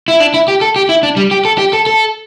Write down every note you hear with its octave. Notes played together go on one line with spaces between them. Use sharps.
E4
D4
E4
G4
A4
G4
E4
D4
G3
G4
A4
G4
A4
A4